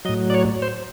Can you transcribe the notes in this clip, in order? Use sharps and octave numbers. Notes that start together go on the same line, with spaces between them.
A2 F#3 D#5
D5
C#5
C5